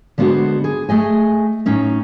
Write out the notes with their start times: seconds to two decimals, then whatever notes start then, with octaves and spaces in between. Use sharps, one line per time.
0.18 D3 G#3 B3 D4 F#4 C5
0.64 G#4
0.89 A3 G#4 D#5 G#5
1.66 A2 C#4 D#4